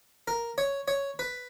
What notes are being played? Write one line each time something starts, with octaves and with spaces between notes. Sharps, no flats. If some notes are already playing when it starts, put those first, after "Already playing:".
A#4
C#5
C#5
B4